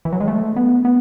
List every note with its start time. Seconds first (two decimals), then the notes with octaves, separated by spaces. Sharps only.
0.05 E3
0.12 F#3
0.20 G#3
0.28 A3
0.56 B3
0.85 B3